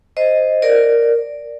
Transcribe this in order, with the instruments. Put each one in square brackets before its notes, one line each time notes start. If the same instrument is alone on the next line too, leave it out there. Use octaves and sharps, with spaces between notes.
[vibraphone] C5 D#5
A#4 D5